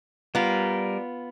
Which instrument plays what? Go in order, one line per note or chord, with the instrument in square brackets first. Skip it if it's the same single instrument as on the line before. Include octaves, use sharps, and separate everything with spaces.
[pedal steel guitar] G3 A#4 [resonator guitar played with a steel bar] B3 F4